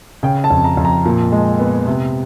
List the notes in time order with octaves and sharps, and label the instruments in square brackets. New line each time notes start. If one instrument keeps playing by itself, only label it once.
[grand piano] C#3 G5
A5
F2
A#5
F2
A#5
A#2
G#3
B3
C3